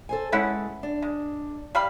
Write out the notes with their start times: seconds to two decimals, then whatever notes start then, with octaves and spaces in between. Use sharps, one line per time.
0.09 A4 C5 G#5
0.32 G#3 C#4 E4 A4 B4 F#5
0.83 D4
1.02 G#3
1.75 G3 F5 B5